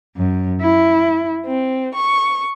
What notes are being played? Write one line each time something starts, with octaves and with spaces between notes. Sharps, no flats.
F#2
E4
C4
C#6